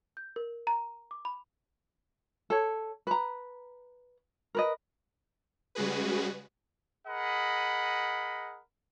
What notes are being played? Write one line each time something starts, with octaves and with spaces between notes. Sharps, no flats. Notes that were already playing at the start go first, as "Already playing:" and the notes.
G6
A#4
A#5
D6
B5
A4 C#5
B4 A#5
A#4 B4 D#5
C#3 G3 G#3 F#4 G#4 B4
G#4 A#4 D#5 F#5 B5